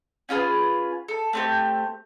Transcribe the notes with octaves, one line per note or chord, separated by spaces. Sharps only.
C#4 F4 G#4 B4
A4
A3 C4 G4